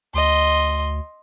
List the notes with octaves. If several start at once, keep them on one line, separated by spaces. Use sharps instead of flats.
D2 D#5 C6